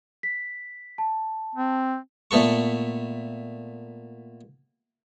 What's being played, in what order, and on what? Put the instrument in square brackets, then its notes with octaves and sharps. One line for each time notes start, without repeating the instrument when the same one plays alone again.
[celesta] B6
A5
[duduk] C4
[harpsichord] A#2 A3 B3 A4 C#6